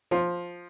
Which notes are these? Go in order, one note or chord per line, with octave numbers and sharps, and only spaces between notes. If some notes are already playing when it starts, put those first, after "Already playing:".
F3